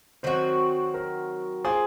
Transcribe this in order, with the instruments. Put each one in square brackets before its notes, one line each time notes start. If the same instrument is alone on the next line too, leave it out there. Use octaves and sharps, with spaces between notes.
[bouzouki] D#3 F#3 C4 F#4 [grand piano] C5
[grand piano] A#4
[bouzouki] A#3 F4 C5 [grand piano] G#4